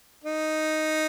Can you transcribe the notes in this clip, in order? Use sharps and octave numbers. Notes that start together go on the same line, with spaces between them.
D#4